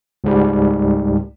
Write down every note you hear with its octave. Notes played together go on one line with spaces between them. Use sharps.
C#2 G#2 G3